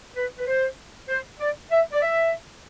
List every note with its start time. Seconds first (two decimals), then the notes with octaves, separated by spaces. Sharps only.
0.16 B4
0.38 B4
0.47 C5
1.09 C5
1.40 D5
1.71 E5
1.92 D5
2.02 E5